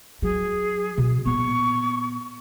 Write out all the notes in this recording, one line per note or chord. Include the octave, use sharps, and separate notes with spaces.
F#3 G#4
B2
A#2 B3 C#6